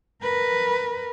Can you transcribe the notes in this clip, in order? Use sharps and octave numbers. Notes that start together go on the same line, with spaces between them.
A#4 B4